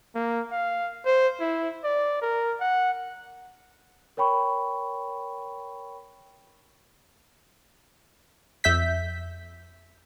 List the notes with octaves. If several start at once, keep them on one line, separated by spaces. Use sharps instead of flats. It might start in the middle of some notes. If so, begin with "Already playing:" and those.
A#3
F5
C5
E4
D5
A#4
F#5
A#4 C#5 G5 B5 C#6
F2 E5 G6 B6